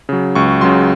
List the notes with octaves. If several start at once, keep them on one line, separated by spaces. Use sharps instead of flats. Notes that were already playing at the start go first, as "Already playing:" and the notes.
C#3 F#3
C#2 C#6
C#3 F#3 C6